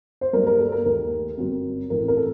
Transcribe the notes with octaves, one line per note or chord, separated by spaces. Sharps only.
C5
G2 F#3 A#3 A#4
A#4
A4
A#4
D#2 D#3 A3 A#4
G1 F#2 F#3 C4
A1 A2 A3 C4 A#4
A#4
A4